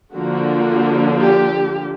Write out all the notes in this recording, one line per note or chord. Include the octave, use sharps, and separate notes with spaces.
D3 F3 A#3 D4 F#4
G4